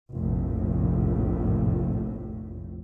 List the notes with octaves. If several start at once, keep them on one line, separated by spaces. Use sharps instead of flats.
F1 A#1 A2